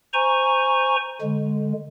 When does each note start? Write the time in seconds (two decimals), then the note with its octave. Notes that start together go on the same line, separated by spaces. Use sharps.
0.13 C5 G#5 A#5 C#6
1.21 D3 G#3